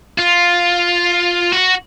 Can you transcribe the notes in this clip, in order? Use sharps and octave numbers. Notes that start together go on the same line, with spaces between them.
F4
F#4